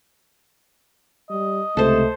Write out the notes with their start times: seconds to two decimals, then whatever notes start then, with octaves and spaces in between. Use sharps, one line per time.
1.30 G3 D#5
1.77 C#2 C3 A3 A4 C5